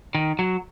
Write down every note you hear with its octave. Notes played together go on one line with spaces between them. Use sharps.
D#3
F#3